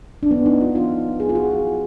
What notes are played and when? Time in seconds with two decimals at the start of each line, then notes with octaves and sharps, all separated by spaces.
0.23 D4
0.31 B3
0.46 D#4
0.60 F4
0.75 F4
1.20 G#4
1.29 F4
1.35 F#4
1.50 F4